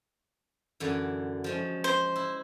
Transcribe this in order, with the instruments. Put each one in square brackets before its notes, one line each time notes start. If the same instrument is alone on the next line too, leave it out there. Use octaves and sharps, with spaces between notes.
[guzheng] F#2 D3 E3
F3 G#3 C#4
[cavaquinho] C5
[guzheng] E4